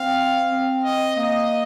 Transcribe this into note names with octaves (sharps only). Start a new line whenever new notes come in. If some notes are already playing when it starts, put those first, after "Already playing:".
Already playing: C4 F5
C4
D#5
A#3 D#5